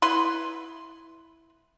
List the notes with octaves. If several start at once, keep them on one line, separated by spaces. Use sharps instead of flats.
E4 B4 C6